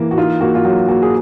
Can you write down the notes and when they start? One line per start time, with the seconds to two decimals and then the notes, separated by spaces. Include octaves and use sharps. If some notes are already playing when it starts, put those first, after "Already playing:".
Already playing: E3 A#3
0.11 F#4
0.18 D#4 F4
0.41 A#3 F#4
0.55 F4
0.65 F#3 F#4
0.89 A#3 F#4
1.02 G#4